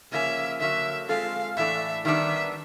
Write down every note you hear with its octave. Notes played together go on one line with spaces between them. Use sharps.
C#3 F3 A#3 C#4 E5
D3 F#3 A#3 E5
G#3 C4 F4 A4 F5
A2 E3 A3 D4 E5
D#3 G3 B3 D4 E5